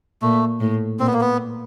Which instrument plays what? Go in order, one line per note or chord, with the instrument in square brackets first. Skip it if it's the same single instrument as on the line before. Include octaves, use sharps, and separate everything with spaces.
[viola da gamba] A#2 [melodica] A3
[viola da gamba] A2
[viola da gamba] A#2 [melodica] C4
[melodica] B3
A#3
B3